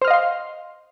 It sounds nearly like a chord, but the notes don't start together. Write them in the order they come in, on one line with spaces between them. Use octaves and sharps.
C5 F6 D#5 F5 C6